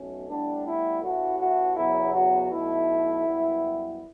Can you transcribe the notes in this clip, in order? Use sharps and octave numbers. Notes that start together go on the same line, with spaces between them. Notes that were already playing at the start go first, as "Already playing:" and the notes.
Already playing: B1 B2 A3 C#4
A2 G3 B3 D4
E4
A1 A2 E3 A3 F#4
F#4
E2 C#3 F#3 B3 E4
F#4
B1 B2 A3 E4
F#2 E3 G3 B3